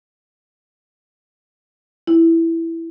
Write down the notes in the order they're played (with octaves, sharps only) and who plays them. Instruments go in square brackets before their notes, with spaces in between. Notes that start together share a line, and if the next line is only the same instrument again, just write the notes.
[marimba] E4